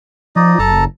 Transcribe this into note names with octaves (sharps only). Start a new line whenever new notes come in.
F3 D#4 D5 D#5
F#1 A4 A5 A#5